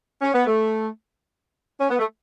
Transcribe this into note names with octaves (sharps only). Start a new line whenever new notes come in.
C#4
B3
A3
C#4
B3
A3